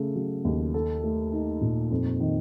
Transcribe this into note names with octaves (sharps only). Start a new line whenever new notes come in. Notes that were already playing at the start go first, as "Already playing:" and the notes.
Already playing: C#3 A3
F#3
D#2
A4
A3
D#4
A#2
F2
D#3